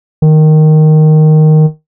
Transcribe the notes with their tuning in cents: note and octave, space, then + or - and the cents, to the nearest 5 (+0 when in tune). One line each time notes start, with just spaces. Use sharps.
D#3 -5